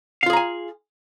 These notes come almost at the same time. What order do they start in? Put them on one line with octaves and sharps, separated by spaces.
F5 F4 G#4 A#5 G#5